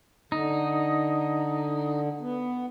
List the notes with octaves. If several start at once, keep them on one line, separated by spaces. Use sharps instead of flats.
D3 D#4
B3